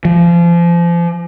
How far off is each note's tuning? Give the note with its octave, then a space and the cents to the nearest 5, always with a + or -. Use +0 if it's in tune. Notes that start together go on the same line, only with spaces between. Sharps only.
F3 -30